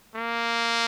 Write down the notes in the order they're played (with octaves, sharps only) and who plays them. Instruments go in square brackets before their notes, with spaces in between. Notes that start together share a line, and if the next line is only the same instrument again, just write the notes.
[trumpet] A#3